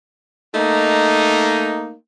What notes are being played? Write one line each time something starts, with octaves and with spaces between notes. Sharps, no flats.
A3 A#3 D#4